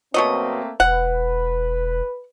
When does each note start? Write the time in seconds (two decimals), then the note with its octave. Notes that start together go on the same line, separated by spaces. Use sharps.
0.14 B2 F#3 A3 A#3 C4 D#5
0.80 E1 B4 F#5